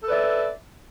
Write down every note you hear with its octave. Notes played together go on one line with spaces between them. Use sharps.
A4 B4 D5 E5